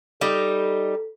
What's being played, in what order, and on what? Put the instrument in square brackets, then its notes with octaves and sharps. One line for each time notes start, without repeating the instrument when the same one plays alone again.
[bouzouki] G3 D#4 [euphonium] A4